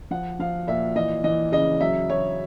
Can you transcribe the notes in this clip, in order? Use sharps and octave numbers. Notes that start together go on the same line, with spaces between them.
F3 F#5
F3 F5
A#2 E5
E3 D#5
E3 D#5
C#3 D#5
F#3 E5
F#3 C#5